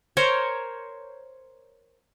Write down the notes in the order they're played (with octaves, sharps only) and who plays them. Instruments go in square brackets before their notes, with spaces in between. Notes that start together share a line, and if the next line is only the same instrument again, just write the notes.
[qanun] A#4 C5 C#5